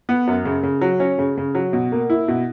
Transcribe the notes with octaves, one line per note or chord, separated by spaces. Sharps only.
B3
F#2
C#3
C#3
F#3
C#4
C#3
C#3
F#3
B2
A#3
E4
B2